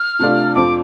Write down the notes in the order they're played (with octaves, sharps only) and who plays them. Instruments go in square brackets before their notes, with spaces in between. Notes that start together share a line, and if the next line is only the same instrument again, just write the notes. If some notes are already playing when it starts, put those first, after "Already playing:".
Already playing: [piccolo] F6
[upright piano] C3 A3 D4 F4 D5
[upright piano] F2 F3 C4 F4 [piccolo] D6